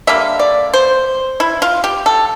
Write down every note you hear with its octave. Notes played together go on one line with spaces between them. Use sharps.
D3 G3 A#3 E5
D5
C5
E4
F4
G4
A4